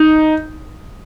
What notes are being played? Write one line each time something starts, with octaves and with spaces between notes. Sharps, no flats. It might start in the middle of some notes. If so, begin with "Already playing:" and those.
Already playing: D#4